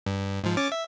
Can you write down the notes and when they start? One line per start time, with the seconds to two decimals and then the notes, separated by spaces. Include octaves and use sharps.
0.06 G2
0.44 G#2 F3
0.57 C#4 D6 A6
0.72 E5